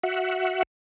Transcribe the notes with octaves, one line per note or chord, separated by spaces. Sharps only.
F#4 E5 F#5